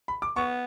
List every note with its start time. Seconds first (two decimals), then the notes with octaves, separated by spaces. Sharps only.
0.08 B5
0.22 D6
0.36 B3 C#6